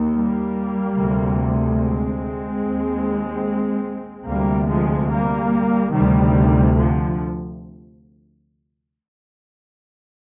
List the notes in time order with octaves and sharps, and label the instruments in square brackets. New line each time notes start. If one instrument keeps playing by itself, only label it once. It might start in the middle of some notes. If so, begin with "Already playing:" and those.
Already playing: [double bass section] D#2
G3 A#3
D2 C3
G#3 C4
D#2
D2 C3 G3 A#3
F3 G#3
G3 A#3
D2 C3 D#3 G3
D3 F3